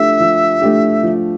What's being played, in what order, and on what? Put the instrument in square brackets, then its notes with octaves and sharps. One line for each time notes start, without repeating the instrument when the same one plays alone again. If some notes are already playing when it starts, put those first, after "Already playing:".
Already playing: [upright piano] F3 A3 D4 G4 [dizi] E5
[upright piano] F3
A3 D4 G4
F3